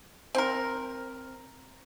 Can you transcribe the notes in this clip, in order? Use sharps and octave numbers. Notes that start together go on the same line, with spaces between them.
C4 A#4